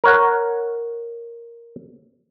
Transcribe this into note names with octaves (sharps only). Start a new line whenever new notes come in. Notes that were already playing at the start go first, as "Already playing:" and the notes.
A#4 C#5 F#5